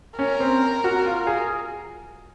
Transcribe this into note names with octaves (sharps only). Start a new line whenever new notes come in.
C#4 A#4
C4
F#4
F4
G#4